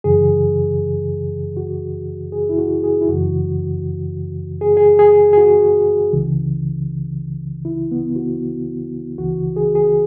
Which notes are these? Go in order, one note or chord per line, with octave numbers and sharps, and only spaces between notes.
F#2 C#3 E3 G#4
F#4
G#4
E4
F#4
G#4
E4
F#2 C#3 E3 F#4
G#4
G#4
G#4
G#4
F#4
C#2 C#3 E3
E4
B3
F#4
C#2 C#3 E3 F#4
G#4
G#4